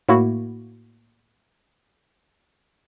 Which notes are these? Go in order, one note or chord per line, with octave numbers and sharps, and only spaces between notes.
A2 A#3 E4 F#4